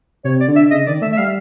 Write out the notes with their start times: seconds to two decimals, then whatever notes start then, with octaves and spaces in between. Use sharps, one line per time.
0.24 C3 C#5
0.41 D5
0.48 D3
0.56 E5
0.71 C#3 D#5
0.87 D#3 D5
1.02 A3 E5
1.12 E5
1.18 G3 F5